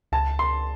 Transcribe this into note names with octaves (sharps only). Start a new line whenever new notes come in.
C#2 A5
C6